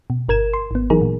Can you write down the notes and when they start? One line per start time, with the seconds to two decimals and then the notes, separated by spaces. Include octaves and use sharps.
0.10 B2
0.29 G1 A#4 G#6 E7
0.54 C6
0.71 G#1 B3
0.90 E3 F#3 D#4 G#4 A#4
1.02 A#2